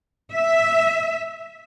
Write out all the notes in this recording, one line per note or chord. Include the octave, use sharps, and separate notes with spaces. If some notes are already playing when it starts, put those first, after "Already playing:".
E5